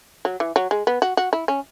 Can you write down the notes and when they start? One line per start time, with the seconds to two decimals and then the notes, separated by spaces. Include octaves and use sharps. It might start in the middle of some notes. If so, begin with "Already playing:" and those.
0.25 F#3
0.40 E3
0.56 F#3
0.71 G#3
0.87 B3
1.02 F#4
1.17 F#4
1.33 E4
1.48 C#4